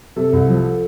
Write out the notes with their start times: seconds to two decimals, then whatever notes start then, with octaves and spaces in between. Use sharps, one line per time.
0.16 C3 A4
0.33 C2
0.49 F3